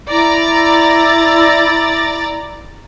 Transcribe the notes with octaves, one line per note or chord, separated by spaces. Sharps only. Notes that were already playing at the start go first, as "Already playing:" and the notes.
E4 D5 A#5 A6